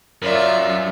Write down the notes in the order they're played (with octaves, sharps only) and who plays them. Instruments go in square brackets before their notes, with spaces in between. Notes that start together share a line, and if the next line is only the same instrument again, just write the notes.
[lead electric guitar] F#2 [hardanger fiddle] F4 E5 [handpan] A#4 C#5 D5